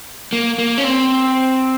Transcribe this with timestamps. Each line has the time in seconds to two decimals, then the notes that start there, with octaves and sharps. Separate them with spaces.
0.33 A#3
0.58 A#3
0.78 C#4
0.84 C4